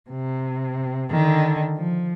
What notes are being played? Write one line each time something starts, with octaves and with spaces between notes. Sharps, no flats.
C3
D3 D#3
F3